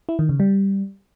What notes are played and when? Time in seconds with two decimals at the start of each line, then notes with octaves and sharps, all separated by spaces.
0.09 E4
0.19 D#3
0.29 C#3
0.40 G3